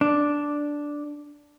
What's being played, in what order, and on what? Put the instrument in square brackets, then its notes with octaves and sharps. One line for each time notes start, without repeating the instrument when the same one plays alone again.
[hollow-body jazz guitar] D4